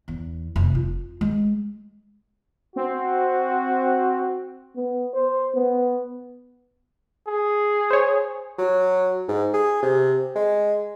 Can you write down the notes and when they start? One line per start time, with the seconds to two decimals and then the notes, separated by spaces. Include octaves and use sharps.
0.08 E2
0.56 F1
0.75 F4
1.21 G#3
2.76 C4 F#4
4.76 B3
5.13 C5
5.54 B3
7.28 G#4
7.90 C5 C#5
8.58 F#3
9.29 G#2
9.53 G#4
9.82 C3
10.35 G#3